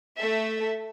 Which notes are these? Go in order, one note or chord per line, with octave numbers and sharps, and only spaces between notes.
A3 A4 E5